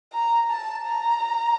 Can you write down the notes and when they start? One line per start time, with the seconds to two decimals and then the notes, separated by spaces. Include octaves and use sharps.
0.13 A#5
0.50 A5
0.87 A#5